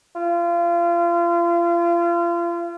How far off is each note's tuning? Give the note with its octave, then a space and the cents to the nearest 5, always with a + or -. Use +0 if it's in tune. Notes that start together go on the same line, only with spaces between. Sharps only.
F4 -30